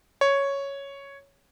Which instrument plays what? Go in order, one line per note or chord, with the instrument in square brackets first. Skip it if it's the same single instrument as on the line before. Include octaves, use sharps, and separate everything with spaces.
[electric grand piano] C#5